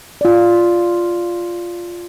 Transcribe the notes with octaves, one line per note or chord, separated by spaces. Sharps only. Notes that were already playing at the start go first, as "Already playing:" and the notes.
F4 D5